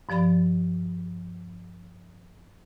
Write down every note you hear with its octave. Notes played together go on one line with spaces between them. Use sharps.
G2 F3 D5 B5 A6